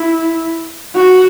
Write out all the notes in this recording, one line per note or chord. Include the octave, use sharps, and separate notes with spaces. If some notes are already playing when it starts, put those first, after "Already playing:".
Already playing: E4
F#4